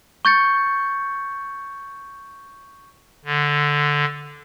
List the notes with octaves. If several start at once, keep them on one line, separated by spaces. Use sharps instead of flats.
C#6 G6 A6 C#7
D3